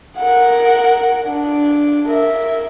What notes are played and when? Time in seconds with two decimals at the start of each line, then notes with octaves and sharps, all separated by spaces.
0.19 A#4 F#5
1.27 D4
2.08 A#4 E5